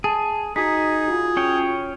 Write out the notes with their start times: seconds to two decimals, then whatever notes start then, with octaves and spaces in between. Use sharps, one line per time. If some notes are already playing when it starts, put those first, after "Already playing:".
0.04 G#4 A5
0.56 D#4 F#4 G#4 B6
1.08 F4 F#4
1.37 C#4 C#5 G5